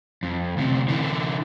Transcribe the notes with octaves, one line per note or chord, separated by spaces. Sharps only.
F2
D2 C3
D3 E3